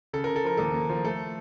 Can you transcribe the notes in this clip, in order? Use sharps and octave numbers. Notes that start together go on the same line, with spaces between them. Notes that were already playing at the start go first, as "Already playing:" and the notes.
C#3 A4
C#3 A#4
A4
F3 A#4
D#2 A4
A#3
F3
A3 A4